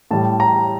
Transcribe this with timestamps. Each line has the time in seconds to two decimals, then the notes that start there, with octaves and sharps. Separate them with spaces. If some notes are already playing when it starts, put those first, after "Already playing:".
0.11 A2 G3 A5
0.40 A#5